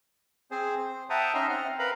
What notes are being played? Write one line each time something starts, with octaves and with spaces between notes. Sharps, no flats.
C4 G#4 C5
C5
E5 F#5 G5 A5 A#5 D#6
C#4 D#4 D#5 E5 A#5 C6
C4 F#5 F6
A#4 B4 F5 A#5 B5